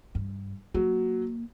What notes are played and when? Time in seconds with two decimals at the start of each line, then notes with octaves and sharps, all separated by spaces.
0.15 G2
0.74 F#3 A#3